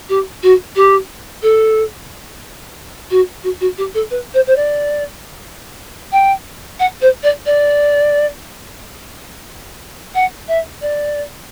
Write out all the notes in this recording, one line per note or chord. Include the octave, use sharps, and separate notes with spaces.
G4
F#4
G4
A4
F#4
F#4
F#4
G4
A4
B4
C5
C5
D5
G5
F#5
C5
D5
D5
F#5
E5
D5